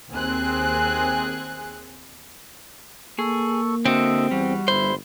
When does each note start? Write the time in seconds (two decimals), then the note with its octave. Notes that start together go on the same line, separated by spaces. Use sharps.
0.13 D#2 C4 G#4 F#6
3.19 A#3 G#4 A4 C#6
3.85 D3 C4 F#4 A4 D#5 E5
4.31 E2 G3 F#4
4.68 G1 E4 C5